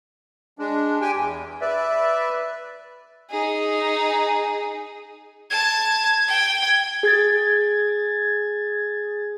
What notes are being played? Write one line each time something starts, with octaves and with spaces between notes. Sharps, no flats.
G#3 D4
G4 G5 G#5
E2
B4 D5 E5
D#4 G#4
A5 G#6
G5
G#4 G#6 A6